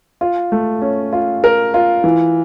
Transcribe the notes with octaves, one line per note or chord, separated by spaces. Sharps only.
F4
A3
C#4
F4
A#4
F4
E3